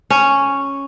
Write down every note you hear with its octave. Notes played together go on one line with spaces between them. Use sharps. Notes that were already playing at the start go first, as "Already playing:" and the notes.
C#4